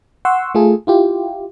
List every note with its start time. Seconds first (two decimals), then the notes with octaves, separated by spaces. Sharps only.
0.25 F#5 C6 C#6 E6
0.55 A3 F4 G#4 A4
0.87 E4 F4 G4